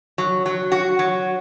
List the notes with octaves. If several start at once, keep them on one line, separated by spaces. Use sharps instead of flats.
F#3
F#3
F#4
F#3